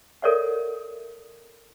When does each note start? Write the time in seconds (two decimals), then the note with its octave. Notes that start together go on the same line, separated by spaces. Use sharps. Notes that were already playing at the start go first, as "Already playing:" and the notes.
0.22 A4 A#4 C#5 D5 E5 F#5